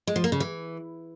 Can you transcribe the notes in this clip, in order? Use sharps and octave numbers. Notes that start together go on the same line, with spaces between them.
G#3
F3
A#3
C#3
E3